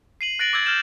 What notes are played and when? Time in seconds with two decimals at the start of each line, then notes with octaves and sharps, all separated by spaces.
0.21 C7 D#7 F#7
0.39 F#6 A6 A#6 D7 F#7
0.53 D6 E6 G#6 A6
0.66 F6 G6 E7